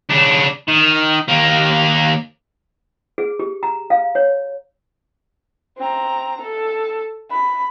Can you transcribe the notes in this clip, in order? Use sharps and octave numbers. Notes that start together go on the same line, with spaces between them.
C#3 D4
D#3
D#2 A#3
G#4
G4
A#5
F5
C#5
C4 A#5
A4
B5